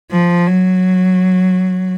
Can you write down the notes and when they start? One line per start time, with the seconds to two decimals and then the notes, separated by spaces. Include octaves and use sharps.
0.12 F3
0.47 F#3